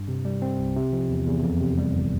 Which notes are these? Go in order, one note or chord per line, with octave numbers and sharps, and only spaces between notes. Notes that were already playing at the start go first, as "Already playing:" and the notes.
Already playing: G2
C3
G3
C4
C2
C3
F3
E2
E2
F2
C3
G3
G1